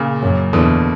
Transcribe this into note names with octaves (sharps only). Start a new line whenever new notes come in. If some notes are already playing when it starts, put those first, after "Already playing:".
Already playing: A#2 C#3
F#2
E2 B2 D3